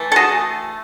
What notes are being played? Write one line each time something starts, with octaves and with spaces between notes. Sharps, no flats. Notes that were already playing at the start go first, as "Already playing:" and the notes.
Already playing: E3 A3
A4
F#4 G#4